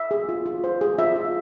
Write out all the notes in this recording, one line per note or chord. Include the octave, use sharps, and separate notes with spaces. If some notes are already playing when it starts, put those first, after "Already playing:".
Already playing: E5
G#4
F4
F4
C5
G#4
F4 E5
F4